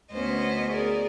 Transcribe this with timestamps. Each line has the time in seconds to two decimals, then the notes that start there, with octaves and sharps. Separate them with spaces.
0.13 D2 B3 C#4 C5 D#5
0.72 G#4 A#4 D5